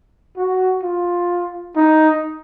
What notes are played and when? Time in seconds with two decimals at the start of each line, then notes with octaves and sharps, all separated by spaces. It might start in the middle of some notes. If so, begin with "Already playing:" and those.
0.37 F#4
0.83 F4
1.76 D#4